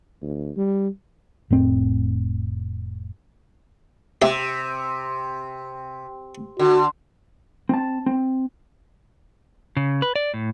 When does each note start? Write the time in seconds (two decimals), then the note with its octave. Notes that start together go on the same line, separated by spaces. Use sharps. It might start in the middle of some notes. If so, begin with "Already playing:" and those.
0.22 D2
0.57 G3
1.50 F1 A2 C4
4.22 C3 G4 E5
6.59 D3 F#4
7.69 C4 A5
8.06 C4
9.77 C#3
10.02 B4
10.16 D5
10.34 A2